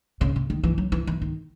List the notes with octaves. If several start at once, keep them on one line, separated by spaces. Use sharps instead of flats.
C#3
C#3
D#3
E3
F#3
E3
E3
D#3